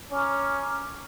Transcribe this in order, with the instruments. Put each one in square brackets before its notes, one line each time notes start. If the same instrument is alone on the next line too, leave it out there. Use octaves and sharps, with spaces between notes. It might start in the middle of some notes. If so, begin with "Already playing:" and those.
[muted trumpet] C#4 [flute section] A#5 D6 F6